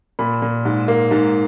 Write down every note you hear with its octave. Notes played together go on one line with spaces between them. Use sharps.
A#2 B5
A#2
G#2
A#3
G#2